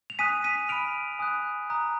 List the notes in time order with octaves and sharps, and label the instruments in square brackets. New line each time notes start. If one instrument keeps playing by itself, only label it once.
[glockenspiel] F7
G#5 D#6 F#6 B6 D#7
B6 D#7
B5 F6 D7 F7
G#5 D#6 F#6
A#5 D#6 F#6